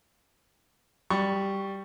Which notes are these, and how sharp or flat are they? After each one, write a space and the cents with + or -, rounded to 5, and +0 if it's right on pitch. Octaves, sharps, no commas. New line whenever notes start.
G3 +0 C#6 +0